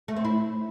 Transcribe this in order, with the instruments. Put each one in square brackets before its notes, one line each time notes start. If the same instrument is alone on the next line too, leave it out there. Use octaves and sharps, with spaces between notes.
[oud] A3
C4
E4